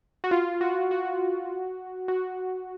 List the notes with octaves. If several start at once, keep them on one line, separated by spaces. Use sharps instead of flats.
F#4
F4
F#4
F#4
F#4